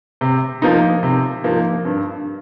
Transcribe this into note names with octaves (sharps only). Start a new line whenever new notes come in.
C3
F3 A#3 D#4
C3
F3 A#3 D#4
G2